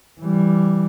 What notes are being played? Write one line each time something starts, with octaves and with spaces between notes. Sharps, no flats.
E3 G3